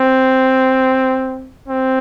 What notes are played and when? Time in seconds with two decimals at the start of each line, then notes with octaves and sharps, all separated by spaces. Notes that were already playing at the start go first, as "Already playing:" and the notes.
Already playing: C4
1.68 C4